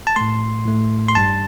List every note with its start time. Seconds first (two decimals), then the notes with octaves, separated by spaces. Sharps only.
0.07 A5
0.16 A2 A3 C6
0.66 A2 A3
1.08 C6
1.15 G2 G3 A5